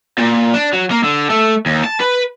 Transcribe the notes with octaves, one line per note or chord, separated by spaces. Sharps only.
A#2
D4
F#3
A#3
D3
A3
D#2
A5
B4